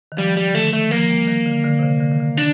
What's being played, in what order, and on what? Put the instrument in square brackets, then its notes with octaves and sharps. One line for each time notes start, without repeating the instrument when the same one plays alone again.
[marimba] D#3
[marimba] F3 [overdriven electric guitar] G3
[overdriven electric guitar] G3
[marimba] D3
[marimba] D#3 [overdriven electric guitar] A3
[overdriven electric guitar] A3
[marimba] D#3
[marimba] F3 [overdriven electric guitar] A#3
[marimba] G3
D#3
D3
D3
C3
D3
D3
D#3
D3
[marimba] D#3 [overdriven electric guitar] D4